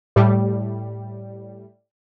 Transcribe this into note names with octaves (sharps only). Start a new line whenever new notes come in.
A2 G3